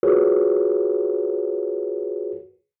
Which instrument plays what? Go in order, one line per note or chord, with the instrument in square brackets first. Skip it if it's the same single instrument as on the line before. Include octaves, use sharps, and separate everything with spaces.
[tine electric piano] F4 F#4 G#4 A#4 B4 C#5